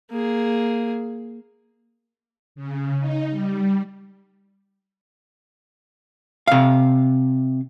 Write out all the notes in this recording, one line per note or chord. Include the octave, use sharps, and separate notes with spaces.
A#3 G#4
C#3
D#4
G3
C3 F5